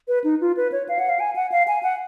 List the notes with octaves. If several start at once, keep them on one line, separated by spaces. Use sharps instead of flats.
B4
D#4
F4
B4
C#5
F5
F#5
F5
G#5
F#5
F5
G#5
F#5